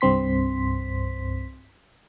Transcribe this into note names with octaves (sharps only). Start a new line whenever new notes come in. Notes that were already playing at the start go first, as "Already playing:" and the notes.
C2 G2 C4 C6 B6